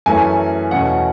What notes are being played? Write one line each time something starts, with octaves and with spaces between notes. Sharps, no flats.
F#2 E3 A3 C#4 G#5
E2 B2 A3 C#4 F#5